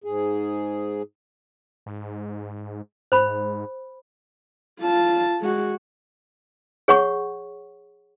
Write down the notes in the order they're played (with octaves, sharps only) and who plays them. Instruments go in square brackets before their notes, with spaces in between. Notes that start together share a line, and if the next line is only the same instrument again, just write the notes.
[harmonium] G#2 G#4
[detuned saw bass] G#2
[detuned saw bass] G#2 [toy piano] C5 B5
[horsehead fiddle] F4 A5
G#3 F#4
[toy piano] G#4 C#5 F#5 C#6